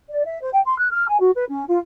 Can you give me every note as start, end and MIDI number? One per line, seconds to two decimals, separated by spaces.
0.08 0.23 74
0.24 0.37 76
0.41 0.48 72
0.52 0.60 79
0.64 0.76 84
0.78 0.87 90
0.91 1.06 89
1.06 1.19 80
1.20 1.30 66
1.34 1.44 71
1.48 1.62 61
1.68 1.77 65